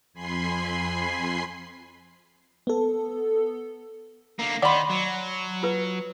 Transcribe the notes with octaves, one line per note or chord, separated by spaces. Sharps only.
F2 G#5 B5 C6 C7
B3 A4
D3 A#3
D#3 D5 F#5 B5 C6
F#3
F4 B4